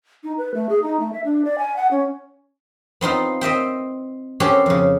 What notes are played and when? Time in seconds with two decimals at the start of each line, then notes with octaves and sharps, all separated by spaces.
0.24 D#4
0.38 B4
0.54 A3
0.69 G#4
0.82 D#4
1.00 A3
1.13 E5
1.25 D4
1.45 D5
1.58 G#5
1.76 F#5
1.91 C#4
3.01 B3 C4 D#4 F4
3.41 C4 D#5 E5 G5
4.40 C4 C#4 F#4 G4 A4 C#5
4.66 F2 C#3